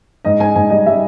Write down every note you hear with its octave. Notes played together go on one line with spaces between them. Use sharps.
G#2 D#5
G#2 G#5
G#2 G#5
G3 D#5
G3 E5